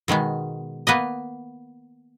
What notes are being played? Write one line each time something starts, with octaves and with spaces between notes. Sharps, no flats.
B2 D#3 G#3 B3
A#3 B3 B4 D#5